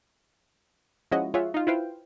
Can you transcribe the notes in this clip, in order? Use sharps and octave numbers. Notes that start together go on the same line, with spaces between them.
F3 G#3 C#4 E4 F#4 D#5
F4 G#4 C#5 E5 F#5
D#4 F4
E4 F4 B4 C5 F5 G5